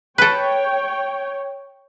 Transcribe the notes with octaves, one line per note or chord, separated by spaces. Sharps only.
A4 B4 C#5 G5